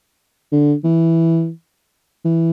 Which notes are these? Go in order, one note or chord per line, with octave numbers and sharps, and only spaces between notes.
D3
E3
E3